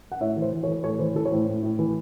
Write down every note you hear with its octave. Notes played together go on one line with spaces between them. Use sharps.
F#5
A2 C#5 E5
E3
C5
E3
A4 C#5
E3
A2 A4 C#5
E3 C5
E3 A4
C#5
A2 C5
A2
A2
E3